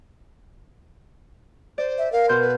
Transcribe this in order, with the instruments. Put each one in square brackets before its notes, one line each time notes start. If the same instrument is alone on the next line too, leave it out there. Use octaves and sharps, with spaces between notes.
[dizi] C5 [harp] D5
[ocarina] E5
[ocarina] A#4 [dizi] F5
[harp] B2 F6 G6 [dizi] C6
[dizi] B4